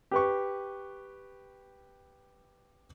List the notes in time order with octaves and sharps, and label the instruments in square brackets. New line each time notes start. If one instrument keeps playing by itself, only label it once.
[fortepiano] G4 B4 C#6